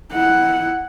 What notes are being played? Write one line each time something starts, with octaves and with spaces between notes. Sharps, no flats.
E4 F#5